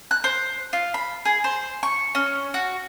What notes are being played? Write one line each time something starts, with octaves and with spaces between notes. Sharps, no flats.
F#6
C5
F4
B5
G#4
C5
C#6
C#4
F#4